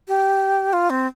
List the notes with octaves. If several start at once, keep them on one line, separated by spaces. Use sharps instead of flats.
G4
F4
C4